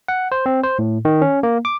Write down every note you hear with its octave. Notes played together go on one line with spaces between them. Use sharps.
F#5
C5
C4
C5
A2
D#3
C#4
A#3
D6